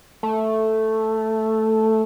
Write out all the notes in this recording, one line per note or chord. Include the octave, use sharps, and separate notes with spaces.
A3